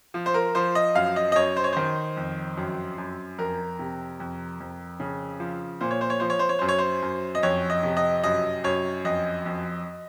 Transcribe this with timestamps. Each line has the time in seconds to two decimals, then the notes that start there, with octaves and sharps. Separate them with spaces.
0.14 F3
0.26 C5
0.34 A#4
0.55 F3 C5
0.75 D#5
0.95 F#2 F5
1.16 D#5
1.32 D#5
1.36 F#2 C#5
1.57 C5
1.64 C#5
1.73 D#3 C5
2.17 F2
2.57 F#2
2.98 F#2
3.38 F2 A#4
3.79 C3
4.20 F2
4.60 F2
5.00 C#3
5.40 F3
5.81 A#2 C5
5.91 C#5
6.01 C5
6.10 C#5
6.20 F3 C5
6.30 C#5
6.39 C5
6.49 C#5
6.59 F#2 C5
6.69 C#5
6.78 C5
7.02 F#2
7.35 D#5
7.43 F2 C#5
7.70 D#5
7.83 C3
7.97 D#5
8.24 F#2 D#5
8.64 F#2 C#5
9.05 F2 D#5
9.45 F2